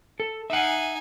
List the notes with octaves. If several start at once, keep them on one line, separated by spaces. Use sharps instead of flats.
A4
D#4 E5 F#5 G#5